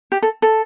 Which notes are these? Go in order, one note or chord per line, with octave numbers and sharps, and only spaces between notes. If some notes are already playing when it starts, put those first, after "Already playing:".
G4
A4
A4